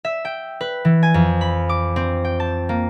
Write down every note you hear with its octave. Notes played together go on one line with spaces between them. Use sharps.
E5
G5
B4
E3
G#5
F2
B5
D6
C4
G5
A5
A#3